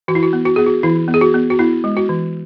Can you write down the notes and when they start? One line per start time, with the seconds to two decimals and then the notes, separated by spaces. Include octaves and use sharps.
0.08 E3 F#4
0.15 E4
0.23 F#4
0.33 B3
0.45 F#4
0.56 B3 G#4
0.66 F#4
0.83 E3 E4
1.08 B3
1.14 G#4
1.21 F#4
1.34 B3
1.50 F#4
1.59 B3 E4
1.84 G#3
1.97 F#4
2.09 E3